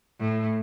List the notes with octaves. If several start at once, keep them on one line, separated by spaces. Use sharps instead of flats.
A2